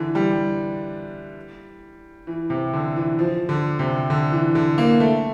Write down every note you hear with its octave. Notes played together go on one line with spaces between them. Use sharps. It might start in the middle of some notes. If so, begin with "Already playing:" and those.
Already playing: D3 E3
G3
E3
C3
D3
E3
F3
D3
C3
D3
E3
D3
A#3
A3